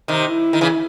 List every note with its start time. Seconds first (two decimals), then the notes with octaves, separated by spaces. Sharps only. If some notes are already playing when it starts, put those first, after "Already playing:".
0.08 C3 D#3
0.26 E4
0.53 D#3
0.61 C#3 E3